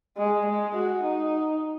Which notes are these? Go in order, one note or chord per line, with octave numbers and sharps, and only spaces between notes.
G#3
G#3
F#4
D#4